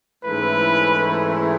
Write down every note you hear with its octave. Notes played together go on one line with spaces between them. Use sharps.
G#2 E3 A3 C#4 E4 B4